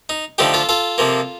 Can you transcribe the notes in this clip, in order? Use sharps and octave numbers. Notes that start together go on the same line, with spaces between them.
D#4
D3 F3 A3 D#4 G4
F4 A4
F4 A4
C3 F3 A#3